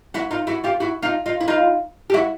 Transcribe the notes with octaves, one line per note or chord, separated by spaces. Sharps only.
E4 F#4
D#4 F4
E4 F#4
F4 G4
E4 F#4
D#4 F4
D#4 F4
E4
D#4 F4
G4
E4 F#4